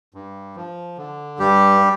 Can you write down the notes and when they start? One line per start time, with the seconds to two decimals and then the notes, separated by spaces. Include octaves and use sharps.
0.14 G2
0.56 F3
0.97 D3
1.39 G2 G3 G4